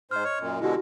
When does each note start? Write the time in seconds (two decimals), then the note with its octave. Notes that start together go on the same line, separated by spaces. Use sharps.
0.11 G#2 C5 D#5 F6
0.24 C#5
0.40 F#2 A#2
0.60 B2 D3 G#3 E4 F#4 G4